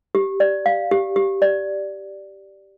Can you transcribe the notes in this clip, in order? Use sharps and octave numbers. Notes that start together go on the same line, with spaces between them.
G4
D5
F5
G4
G4
D5